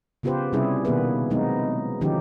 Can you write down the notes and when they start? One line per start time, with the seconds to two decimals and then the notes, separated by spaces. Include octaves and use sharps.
0.23 C#3 B3 F4 G4 B4 C5
0.53 C3 G3 C#4 E4 G#4
0.85 B2 D#3 A#3 B3 G#4 B4
1.30 F#3 G#3 B3 C4 D#4
2.01 D3 D#3 F3 C#4 D#4 G4